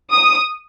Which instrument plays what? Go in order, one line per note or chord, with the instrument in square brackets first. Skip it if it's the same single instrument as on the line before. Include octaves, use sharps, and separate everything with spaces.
[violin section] D#6